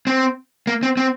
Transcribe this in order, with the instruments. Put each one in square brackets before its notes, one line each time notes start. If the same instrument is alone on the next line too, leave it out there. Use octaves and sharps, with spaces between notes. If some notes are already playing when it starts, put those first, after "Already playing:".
[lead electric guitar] C4
A#3
C4
C4